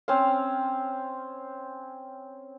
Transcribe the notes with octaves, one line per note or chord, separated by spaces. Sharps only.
C4 C#4 C5 F5